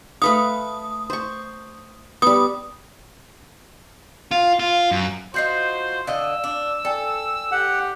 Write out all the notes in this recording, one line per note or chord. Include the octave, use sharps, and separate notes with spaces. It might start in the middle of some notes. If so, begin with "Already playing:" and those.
A3 B4 F5 D#6
C5 C#6
G3 B3 D#6
F4
F4
F#2
D#4 F4 F#4 C5 C6 G6 C7
D3 D#5 F5 E6
D4
A4 D5 G5 G#5
G4 F#5